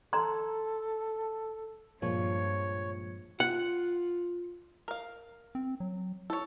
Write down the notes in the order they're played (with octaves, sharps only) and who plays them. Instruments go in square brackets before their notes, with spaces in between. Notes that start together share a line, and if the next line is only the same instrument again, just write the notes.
[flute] A4 [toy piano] A#5 C6
[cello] G2 [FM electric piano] A#2 F3 G#3 [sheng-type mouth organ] C#5
[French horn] F4 [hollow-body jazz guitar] F#5
[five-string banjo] A#4 F5
[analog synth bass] C4
F#3
[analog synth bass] E4 [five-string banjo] A4 C#5